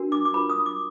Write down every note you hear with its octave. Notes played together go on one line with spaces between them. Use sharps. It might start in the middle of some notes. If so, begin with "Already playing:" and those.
Already playing: D4 F#4 A#4
D6
D6
F4 A#4 B5
D#6
D6